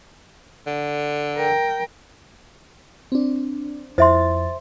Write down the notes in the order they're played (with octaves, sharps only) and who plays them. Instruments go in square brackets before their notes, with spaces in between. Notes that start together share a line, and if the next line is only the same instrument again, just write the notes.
[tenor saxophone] D3
[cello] A#4 G5
[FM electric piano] C4 D4
[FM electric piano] F2 E4 A6 [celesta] C5 E5 C6